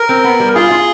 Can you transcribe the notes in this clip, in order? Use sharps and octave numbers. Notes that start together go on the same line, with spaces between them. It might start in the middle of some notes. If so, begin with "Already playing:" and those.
Already playing: A#4
C4
B3
G3
F4 G#4
F4